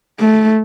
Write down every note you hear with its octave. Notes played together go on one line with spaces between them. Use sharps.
A3